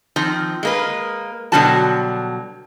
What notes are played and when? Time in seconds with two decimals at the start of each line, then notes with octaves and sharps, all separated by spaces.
0.16 D#3 F3 C4
0.63 G#3 A#3 B4
1.52 B2 D3 F#3 G3 F#4 A5